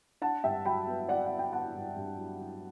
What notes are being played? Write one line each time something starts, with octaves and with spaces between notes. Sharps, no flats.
D4 F#5 A5
G2 E5 G5
F#3 G5 B5
B3
B3 D5 F#5
F#5
B3
G5
B3 F#5 A5
G2
G2
F#3
F#3